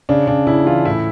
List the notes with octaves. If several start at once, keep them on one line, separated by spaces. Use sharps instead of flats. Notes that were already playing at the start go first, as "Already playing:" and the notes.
C#3 D4
C#3 D4
C#3 E4
E3 F4
A2 E4